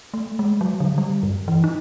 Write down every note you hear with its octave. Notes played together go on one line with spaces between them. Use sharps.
A3
G#3
F#3
D3
G3
G2
E3
D#4